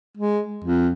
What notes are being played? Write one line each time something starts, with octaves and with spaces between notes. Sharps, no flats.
G#3
F2